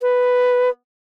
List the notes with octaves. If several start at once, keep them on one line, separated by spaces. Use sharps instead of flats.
B4